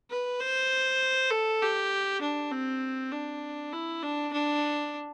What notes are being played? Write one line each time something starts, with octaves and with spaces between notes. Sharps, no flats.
B4
C5
A4
G4
D4
C4
D4
E4
D4
D4